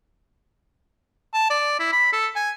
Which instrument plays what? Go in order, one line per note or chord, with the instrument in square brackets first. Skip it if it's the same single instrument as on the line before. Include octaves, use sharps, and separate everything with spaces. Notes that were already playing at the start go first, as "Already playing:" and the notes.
[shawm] A5
D5
E4
B5
A4
G#5